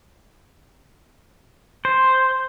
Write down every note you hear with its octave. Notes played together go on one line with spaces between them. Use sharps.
C5